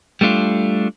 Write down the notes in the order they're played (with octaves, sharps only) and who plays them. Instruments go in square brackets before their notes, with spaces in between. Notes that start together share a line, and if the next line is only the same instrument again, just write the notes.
[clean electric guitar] G3 A3 D4 F4